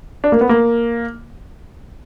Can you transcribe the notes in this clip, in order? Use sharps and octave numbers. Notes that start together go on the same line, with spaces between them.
D4
A#3
B3
A#3